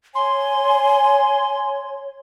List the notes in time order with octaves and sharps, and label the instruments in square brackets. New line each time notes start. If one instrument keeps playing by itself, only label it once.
[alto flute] C#5 [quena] G#5 [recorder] C6